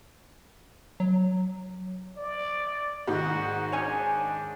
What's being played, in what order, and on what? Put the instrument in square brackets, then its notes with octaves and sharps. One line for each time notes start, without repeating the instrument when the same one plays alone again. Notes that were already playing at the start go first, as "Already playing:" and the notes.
[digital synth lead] F#3
[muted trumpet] D5
[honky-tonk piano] G#2 D#3 [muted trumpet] F#4
[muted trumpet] D4 [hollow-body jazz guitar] C#5 G#5